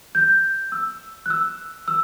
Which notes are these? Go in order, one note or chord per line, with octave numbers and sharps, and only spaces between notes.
G6
E6
F#6
E6
E6